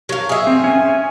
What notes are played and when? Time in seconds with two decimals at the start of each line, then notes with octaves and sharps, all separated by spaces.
0.09 F#3 F5
0.29 G#4 E5
0.47 C4
0.64 C#4 G#5